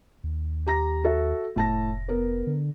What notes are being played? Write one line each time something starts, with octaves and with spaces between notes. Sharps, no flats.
D#2
G4 A#5 A#6
F#4 A4 E5
F1 A2 A5 A#6
B3 A#4
D3